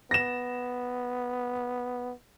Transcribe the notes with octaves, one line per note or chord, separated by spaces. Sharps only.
B3 A#6 E7